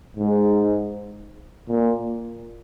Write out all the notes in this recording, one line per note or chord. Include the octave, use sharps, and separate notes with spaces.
G#2
A#2